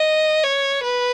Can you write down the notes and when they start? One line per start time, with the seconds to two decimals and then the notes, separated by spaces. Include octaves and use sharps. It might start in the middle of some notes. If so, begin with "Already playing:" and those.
Already playing: D#5
0.44 C#5
0.83 B4